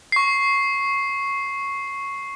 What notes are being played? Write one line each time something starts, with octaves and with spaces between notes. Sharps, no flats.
C#6 C7